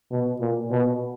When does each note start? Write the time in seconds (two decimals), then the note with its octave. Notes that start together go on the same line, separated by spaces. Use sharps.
0.11 B2
0.41 A#2
0.71 B2